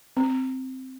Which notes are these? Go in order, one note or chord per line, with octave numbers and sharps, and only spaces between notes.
C4